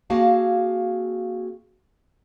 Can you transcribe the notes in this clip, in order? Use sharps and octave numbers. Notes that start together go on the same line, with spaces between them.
A#3 C4 F#4 G#4 F5 A5